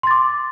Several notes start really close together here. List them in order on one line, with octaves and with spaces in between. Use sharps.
C6 A6 D6